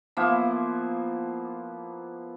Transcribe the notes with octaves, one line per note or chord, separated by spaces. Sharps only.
F3 A#3 B3 E4